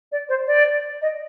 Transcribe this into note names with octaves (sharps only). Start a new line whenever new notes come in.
D5
C5
D5
D#5